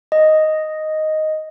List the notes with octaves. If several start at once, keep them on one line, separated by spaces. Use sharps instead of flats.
D#5